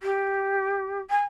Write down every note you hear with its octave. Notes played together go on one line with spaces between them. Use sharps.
G4
G#5